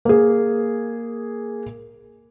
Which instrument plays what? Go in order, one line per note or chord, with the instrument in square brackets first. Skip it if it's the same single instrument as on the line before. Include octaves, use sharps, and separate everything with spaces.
[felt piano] A#3 G#4